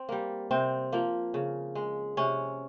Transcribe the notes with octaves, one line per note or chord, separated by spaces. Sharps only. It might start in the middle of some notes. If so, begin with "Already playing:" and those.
Already playing: C4
G3 A#3
C3 C4
F3 A#3
C#3
G#3
C3 C#4